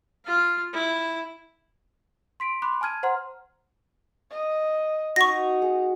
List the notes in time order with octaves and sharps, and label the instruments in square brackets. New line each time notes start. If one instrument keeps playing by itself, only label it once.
[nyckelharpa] F4 F5
E4
[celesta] C6 B6 D7
B5 C6 D6 F#6
G#5 A5 F6 G#6 D#7
C5 F#5 A#5 C6 F6
[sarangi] D#5
[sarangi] D#4 [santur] F#4 [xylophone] C#6 A#6
[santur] G#4